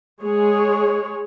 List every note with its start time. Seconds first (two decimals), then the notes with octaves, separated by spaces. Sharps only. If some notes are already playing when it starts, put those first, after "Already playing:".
0.22 G#3 G#4 C#5